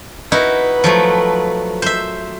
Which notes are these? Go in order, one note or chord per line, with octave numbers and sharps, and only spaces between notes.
D#4 E4 F#4 B4
F3 F#3 A3
C5 E5